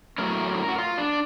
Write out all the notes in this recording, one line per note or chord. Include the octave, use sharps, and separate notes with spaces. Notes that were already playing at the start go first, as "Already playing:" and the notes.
A2 F#3 A3 C#4 A#4
F#4
F4
D4